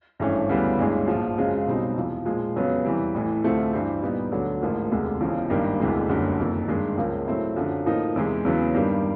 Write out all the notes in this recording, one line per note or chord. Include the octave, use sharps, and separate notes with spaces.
G#1 G2 E3 A3 C#4
D2 C#3 E3 G3 B3
A1 G2 E3 G#3 C#4
A#1 G#2 F3
F#2 C#3 F3 G#3 C4
B1 B2 G3 C4 D#4
E2 C3 F3
A#2 F3 G#3
F2 C#3 F#3 B3
E2 C3 E3 G3
A1 A2 E3
D2 C3 F3 A3 C4
G2 E3 G3 C4
A#2 G3 B3 D#4
D2 D3 F#3
A1 G#2 F3 A#3
E1 D2 C3 F3 G#3
E1 E2 C#3 F3
G#1 G2 D#3 G3 A#3
E1 D2 C3 E3 G#3
F#1 F#2 D3 G3
F#1 F2 C3 D#3
G2 D#3 G#3
C#2 C#3 F3 A#3
A2 F#3 A3 C4 E4
F#2 D3 F3
A2 F3 A#3 D#4
E2 C3 E3 G#3
E2 C#3 F#3 B3
G2 D#3 G3 A#3